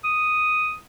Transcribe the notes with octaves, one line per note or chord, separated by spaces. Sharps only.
D#6